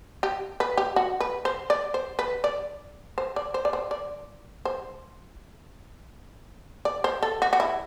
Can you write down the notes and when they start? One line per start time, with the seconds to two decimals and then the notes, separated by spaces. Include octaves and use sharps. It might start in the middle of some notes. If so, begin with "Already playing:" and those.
0.23 G4
0.60 B4
0.77 G4
0.96 F#4
1.20 B4
1.45 C5
1.70 D5
1.94 C5
2.19 B4
2.44 D5
3.18 C5
3.36 D5
3.54 C5
3.65 D5
3.73 C5
3.91 D5
4.65 C5
6.85 D5
7.04 C5
7.23 A4
7.42 F#4
7.53 F#4
7.60 E4